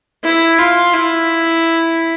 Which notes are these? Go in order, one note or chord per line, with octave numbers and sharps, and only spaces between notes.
E4
F4
E4